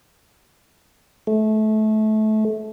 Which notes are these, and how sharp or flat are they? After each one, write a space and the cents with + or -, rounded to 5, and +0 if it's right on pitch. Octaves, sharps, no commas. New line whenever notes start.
A3 -25